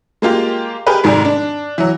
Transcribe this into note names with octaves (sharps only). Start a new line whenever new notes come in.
G#3 A#3 F4 G4
G4 G#4 A#4 B4
F1 G#2 D#3 G#4 D5
D4
E3 F#3